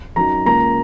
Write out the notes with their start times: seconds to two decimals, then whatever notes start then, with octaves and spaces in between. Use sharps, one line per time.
0.16 F#2 F#3 D#4 A#5
0.45 C#2 C#3 A#3 A#5